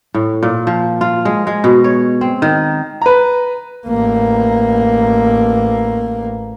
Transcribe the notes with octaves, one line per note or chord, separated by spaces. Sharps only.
A2
A#2
F3
F4
G#3
G#3
B2
C#5
C4
D#3
B4 A#5
A1 A#3